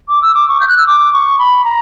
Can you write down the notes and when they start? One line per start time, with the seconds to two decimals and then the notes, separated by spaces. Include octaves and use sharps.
0.08 D6
0.22 E6
0.34 D6
0.48 C#6
0.60 G6
0.68 F#6
0.78 E6
0.87 D6
1.13 C#6
1.39 B5
1.64 A#5